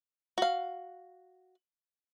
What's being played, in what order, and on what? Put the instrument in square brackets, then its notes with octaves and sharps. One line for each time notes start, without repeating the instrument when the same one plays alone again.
[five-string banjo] F#4 F5